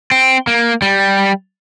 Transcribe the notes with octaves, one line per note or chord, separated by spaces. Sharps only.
C4
A#3
G3